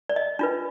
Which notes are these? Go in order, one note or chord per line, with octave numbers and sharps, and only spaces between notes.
D5
D#5
D4 F4 B4